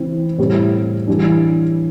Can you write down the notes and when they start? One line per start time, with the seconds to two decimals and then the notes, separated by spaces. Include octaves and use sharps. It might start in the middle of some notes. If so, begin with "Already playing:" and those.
Already playing: E3 C4 E4
0.38 A2 G3 C4
1.07 E3 G3 D4